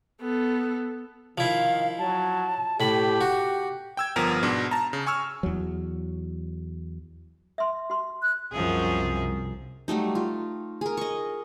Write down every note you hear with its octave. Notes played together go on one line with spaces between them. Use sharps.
B3 A4
D#3 F3 E4 F5
F#3 A5
A2 G4 B5
F#4
G5 E6 G#6
G1 F3 B3 A#4 A#5 F6
G#2 B2 D4
A5 A#5
C#3
G#5 C#6 E6 F6
E2 F#3
E5 C6
F#4 C6
F#6
C2 F#2 F3 G#4
F#3 G3 A3 D#4
F4
G#4 A#4
D#5 C#6